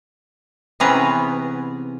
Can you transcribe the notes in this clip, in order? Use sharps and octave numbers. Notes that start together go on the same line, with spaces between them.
C3 E3 B3 C#4 G#4 A#5